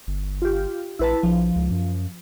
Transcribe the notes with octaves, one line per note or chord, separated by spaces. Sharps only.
G1
F4 G4
A#1 E4 B4 A5
A#1 F3
C#2
F#2